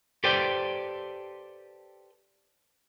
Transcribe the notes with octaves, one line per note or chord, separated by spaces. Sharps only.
G4 A4 B4 C5 D5 G5